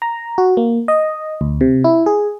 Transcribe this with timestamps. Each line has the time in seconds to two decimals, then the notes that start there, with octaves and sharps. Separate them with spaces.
0.02 A#5
0.38 F#4
0.57 A#3
0.88 D#5
1.41 D2
1.61 C3
1.84 E4
2.06 G#4